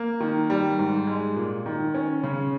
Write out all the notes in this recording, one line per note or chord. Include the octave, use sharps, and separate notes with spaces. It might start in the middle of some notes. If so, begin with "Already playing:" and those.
Already playing: A#3
D#3
G3
G#2
G#3
A#2
D#3
C#4
C#3